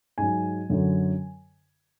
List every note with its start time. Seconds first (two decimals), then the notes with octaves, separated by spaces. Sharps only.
0.18 G#2 F#3 G#5
0.70 F#2 D3 F#3